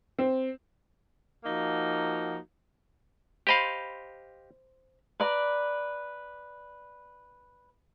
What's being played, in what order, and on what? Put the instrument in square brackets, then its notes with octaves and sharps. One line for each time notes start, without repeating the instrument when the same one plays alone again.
[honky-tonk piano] C4
[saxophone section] F3 A#3 D#4 F#4
[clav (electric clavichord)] G4 D#5 F5 [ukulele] C5 B5
[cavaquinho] B4 D5 A#5